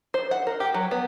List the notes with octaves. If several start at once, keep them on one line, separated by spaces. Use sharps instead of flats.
C5
F#5
A#4
G4
F#3
B3